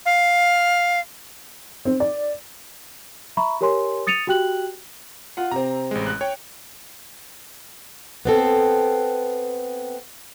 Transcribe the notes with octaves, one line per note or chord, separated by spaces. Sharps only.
F5
C4
D5
E5 A#5 B5 C#6
G4 A#4 C#5 G#5 C6
D#6 A6 C#7 D#7 F7
F#4 G4 G5 F#6 F#7
F4 F#5
C3 C4 A#5
A1 G#3
F#6
C#5 G5
B3 C4 A4